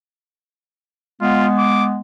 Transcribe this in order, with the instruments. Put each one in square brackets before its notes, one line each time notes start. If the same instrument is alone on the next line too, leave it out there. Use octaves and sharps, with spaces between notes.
[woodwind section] G#3 B3 [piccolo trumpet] F4
[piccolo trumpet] D6